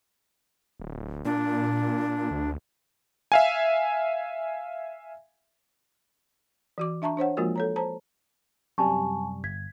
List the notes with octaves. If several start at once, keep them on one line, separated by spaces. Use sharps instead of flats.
D1
A#2 D4
D2
E5 F5 G#5
E3 F#4 D6
D4 E5 A5 A#5 C#6
D4 C5 C#5 F#5
F3 G#3 A#3 F4 F#4 A#4
A4 C#5 A#5
C5 A5 A#5
F#2 C3 G3 G#5 A5 C#6
G1 G#6 B6